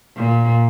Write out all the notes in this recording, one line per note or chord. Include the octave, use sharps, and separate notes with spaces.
A#2